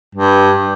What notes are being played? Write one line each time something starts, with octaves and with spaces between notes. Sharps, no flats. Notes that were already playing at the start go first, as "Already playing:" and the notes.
G2